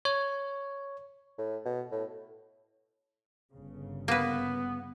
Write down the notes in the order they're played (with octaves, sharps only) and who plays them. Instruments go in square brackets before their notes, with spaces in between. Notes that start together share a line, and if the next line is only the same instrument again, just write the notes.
[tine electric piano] C#5
[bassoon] A2
B2
A2
[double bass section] G1 C#3
[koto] A#3 B4 [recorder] B3